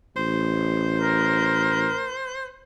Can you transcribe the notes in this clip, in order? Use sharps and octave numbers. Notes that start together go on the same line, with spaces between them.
A1 C5
A#4